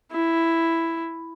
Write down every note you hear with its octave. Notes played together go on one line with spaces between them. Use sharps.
E4